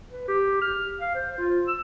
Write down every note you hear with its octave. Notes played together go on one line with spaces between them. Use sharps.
B4
G4
F6
F5
C5
F4
E6